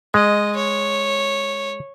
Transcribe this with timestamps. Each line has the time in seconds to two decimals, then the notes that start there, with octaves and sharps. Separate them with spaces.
0.14 G#3 D#5
0.56 C#5